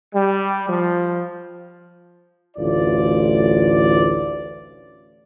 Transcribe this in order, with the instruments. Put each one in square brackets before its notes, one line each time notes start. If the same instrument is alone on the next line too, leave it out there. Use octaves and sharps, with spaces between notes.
[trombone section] G3
F3
[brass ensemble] A1 D2 F4 D5